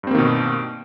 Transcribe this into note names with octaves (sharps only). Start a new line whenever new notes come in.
G2 B2 D#3 A#3 C4